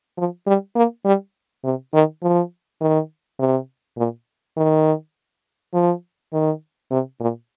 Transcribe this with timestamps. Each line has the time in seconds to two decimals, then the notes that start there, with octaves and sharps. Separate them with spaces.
0.17 F3
0.47 G3
0.75 A#3
1.05 G3
1.64 C3
1.93 D#3
2.22 F3
2.81 D#3
3.39 C3
3.97 A#2
4.57 D#3
5.74 F3
6.33 D#3
6.91 C3
7.20 A#2